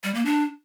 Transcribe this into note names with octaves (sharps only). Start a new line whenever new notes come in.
G3
A#3
D4